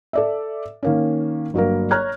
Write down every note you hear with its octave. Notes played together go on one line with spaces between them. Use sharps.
A4 D5 E5
D#3 A#3 C#4
G1 F#3 A#3 A#4
C#5 A#5 F6 F#6 G#6